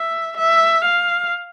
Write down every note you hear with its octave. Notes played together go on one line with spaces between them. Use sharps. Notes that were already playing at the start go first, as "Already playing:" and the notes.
Already playing: E5
E5
F5